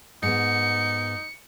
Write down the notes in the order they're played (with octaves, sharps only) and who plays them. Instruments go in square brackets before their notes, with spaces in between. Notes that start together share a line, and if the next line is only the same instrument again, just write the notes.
[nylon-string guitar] G#2 B3 [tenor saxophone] D#4 [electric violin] C#7